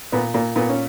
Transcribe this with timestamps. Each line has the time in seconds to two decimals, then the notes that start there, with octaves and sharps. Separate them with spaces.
0.12 A#2 B3
0.34 A#2 A#3
0.56 A#2 B3
0.69 C#4